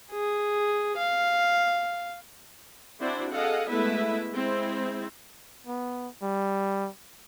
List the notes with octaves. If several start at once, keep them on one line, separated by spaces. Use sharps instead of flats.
G#4
F5
C4 D4 E4 F#4 C5 D5
G#4 A4 D#5 F5 F#5
G#3 A3 B3 E4 B4 E5
G#3 C4 E4
B3
G3